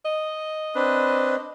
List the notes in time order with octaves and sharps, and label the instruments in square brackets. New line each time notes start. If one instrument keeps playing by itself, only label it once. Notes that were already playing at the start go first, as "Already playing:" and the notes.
[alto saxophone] D#5
[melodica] C4 D4 B4